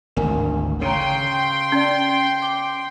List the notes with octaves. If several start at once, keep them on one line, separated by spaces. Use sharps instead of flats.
G#1 D2 A#4 G#5
C#3 C#5 G5 A#5 C6
C#4 D5
D6